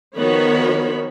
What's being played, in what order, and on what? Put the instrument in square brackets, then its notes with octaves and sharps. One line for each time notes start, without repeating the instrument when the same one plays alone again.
[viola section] D#3 F3 B3 F#4 C#5 B5